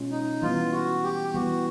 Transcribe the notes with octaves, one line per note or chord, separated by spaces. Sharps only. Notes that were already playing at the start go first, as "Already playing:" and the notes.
Already playing: B2 G#3 C#4 F4
D#4
E3 G3 B3 F4
F#4
G4
E3 G3 B3 F#4